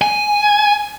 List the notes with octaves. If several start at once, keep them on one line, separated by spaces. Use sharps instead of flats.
G#5